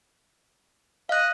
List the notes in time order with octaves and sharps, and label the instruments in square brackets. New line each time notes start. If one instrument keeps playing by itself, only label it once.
[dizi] D#5 [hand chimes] F5 F#6